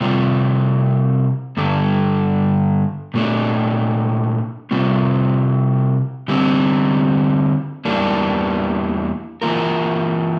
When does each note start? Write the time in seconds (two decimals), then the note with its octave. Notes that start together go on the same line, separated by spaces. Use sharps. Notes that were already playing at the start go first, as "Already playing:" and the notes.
0.01 C3 G3 C4 F4
1.57 G2 D3 G3 D4 A4
3.14 A#2 A3 D4
4.71 C3 G3 C4 F4
6.28 D3 G3 C4
7.85 E2 E3 G3 A#3 D4
9.42 E3 A#3 F4 A#4